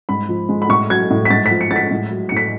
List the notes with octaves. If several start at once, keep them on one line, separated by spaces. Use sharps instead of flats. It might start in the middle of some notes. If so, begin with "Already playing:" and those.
G#2 B5
F3
G#3
B5
A2 C#6
F#3 G#6
A2
B6
G#2 A6
B6
F3
C#7
G#3 A6
B6
A2
F#3
C#7
A2 B6